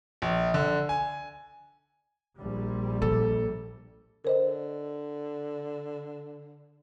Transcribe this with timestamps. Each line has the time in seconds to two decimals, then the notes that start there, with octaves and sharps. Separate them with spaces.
0.22 A#1
0.54 D3
0.89 G#5
2.37 A#1 G3
3.02 A#2 A4
4.25 D3 A#4 C5 D#5